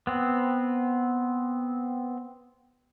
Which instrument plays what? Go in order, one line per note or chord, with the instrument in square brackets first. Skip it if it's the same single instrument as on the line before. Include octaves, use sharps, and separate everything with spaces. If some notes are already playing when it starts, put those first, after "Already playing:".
[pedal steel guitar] B3 C4